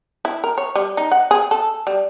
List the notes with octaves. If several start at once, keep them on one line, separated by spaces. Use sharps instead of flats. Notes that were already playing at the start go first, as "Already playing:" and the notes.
E4
A#4
C#5
G3
D#4
F#5
G#4
A4
G3